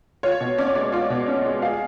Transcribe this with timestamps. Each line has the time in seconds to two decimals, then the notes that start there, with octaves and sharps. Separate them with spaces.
0.23 F4 C#5
0.41 B2
0.58 C#4 D5
0.66 C#5
0.75 G#3 D5
0.92 F4 D5
1.10 B2
1.28 C#4
1.45 G#3
1.62 G#4 F5